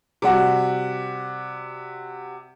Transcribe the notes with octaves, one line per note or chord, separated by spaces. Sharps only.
C3 G3 F#4